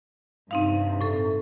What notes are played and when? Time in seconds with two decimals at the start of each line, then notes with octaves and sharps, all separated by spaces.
0.51 G2 C3 C4 D#4 F5
1.01 A2 A4